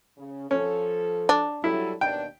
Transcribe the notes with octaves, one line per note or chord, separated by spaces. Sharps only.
C#3
F3 C#4 A4
D4
F#3 G3 E4 A4
D#2 B2 D4 G5